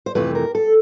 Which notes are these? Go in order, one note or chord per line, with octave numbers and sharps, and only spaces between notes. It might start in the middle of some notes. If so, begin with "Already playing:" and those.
C5
F2 C3 E3 A3 B4
A#4
A4